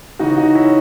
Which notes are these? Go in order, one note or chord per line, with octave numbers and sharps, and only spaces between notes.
C#3 E3 D#4 F#4
D#4 F#4
C#4 E4